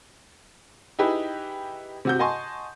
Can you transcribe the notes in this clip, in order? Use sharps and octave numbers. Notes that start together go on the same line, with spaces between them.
D#4 E4 G4 G#4 B4
C3 F#4 G6
D#5 F#5 G#5 A5 C6 C#6